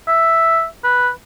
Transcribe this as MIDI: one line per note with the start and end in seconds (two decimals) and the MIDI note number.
0.08 0.65 76
0.83 1.09 71